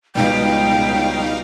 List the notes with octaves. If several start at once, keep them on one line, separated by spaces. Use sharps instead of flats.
C#2 B2 G3 D#4 F5 G5